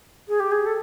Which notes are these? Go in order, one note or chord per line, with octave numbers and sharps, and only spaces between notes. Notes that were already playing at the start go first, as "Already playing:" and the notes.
G#4
G4
G#4
A4